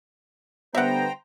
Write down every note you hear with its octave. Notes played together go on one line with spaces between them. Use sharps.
D3 G3 B3 C5 E5 F#5 G5 A#5